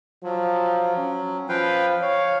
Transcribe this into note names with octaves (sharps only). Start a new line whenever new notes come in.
F3 F#3
C#4
F3 B4 F5 G5
C#5 F5